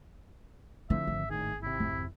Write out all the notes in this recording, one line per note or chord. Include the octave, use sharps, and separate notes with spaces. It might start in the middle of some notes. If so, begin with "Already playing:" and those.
D3 F3 C4 E4 E5
G#1
A2 D#3 G#4
G#1 C3 E4
F2